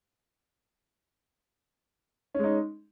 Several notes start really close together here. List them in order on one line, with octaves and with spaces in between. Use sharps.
C#4 G#3 D#4